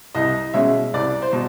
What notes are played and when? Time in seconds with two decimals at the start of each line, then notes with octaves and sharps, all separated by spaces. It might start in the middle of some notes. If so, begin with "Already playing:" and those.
0.15 C2 D#5
0.54 B2 G#3 C#4 E5
0.93 C2 D5
1.22 C5
1.33 B2